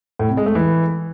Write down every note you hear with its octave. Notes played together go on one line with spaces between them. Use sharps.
A2
C3
G#3
A3
E3